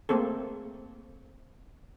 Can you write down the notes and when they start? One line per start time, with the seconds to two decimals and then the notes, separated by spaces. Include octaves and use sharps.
0.09 A3 A#3 C4 G#4 A4